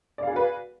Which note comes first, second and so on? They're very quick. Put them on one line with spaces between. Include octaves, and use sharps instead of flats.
D5 F5 G#4 F#4 B4